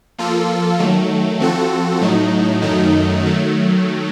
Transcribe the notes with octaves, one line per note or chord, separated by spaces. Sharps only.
F3 A#3 F4 A4
D#3 F#3 A3
F3 C4 F#4 A4
A2 F#3 A3 D#4
F#2 D#3 F#3 A3 D#4
D#3 F#3 A3